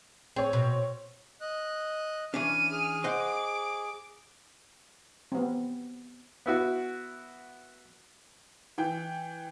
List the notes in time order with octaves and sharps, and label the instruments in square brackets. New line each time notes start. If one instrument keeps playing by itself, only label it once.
[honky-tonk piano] C4 C#5 [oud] G#4
[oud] B2
[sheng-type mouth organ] D#5 F#6
[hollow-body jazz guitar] E3 C#4 D4 [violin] F6 D#7
[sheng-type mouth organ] G#4
[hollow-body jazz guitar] C5 D#5 F#5 [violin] D6
[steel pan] B3 C4
[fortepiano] B3 E4 F#4
[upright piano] E3 G5